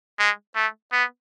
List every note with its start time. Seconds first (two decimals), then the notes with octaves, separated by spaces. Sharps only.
0.19 G#3
0.56 A3
0.93 B3